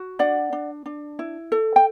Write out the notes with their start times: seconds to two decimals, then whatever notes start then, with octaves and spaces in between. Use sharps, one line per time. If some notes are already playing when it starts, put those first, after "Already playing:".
Already playing: F#4
0.19 D4 D5 F#5
0.53 D4
0.86 D4
1.19 E4
1.52 A4
1.76 G5